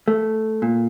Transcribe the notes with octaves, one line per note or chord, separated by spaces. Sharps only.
A3
A#2